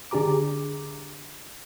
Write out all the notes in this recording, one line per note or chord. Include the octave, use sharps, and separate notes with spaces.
D3 D4 G4 G#4 A#5 D6